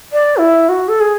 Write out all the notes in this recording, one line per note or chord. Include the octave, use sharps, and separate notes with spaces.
D5
E4
F#4
A4
G#4